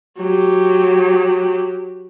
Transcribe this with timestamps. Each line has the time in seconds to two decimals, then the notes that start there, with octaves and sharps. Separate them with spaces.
0.19 F#3 G4